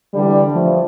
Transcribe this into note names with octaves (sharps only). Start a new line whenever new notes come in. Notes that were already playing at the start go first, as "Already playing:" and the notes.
D3 E3 G3
F3 A3